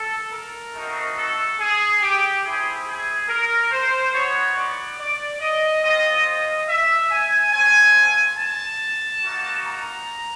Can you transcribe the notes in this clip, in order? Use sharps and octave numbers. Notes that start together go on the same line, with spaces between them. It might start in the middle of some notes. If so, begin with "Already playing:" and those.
Already playing: A4
A#4
A3 C4 D#4 F#4
A4
G#4
G4
C4 E4 G4 G#4
G#4
A#4
C5
B3 D#4 F#4 C#5
D5
D5
D#5
C4 F4 D#5
D#5
E5
G#5
A3 C4 F4 G#5
A5
A#3 D#4 F#4
A#5